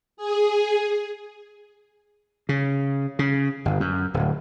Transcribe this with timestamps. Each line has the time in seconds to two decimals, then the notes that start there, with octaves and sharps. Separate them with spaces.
0.17 G#4
2.49 C#3
3.19 C#3
3.65 G1
3.80 F#2
4.14 D1